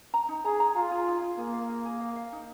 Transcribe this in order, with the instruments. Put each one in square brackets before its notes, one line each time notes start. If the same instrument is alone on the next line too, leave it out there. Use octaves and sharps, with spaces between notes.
[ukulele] A#5
D#4
[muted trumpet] G#4 [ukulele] A#5
[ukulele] A#5
[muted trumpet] F4 [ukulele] F5
[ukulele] G#4
D#4
G#4
[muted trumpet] A#3 [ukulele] G#4
[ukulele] F5
G#4
G#4
F5
F5
D#4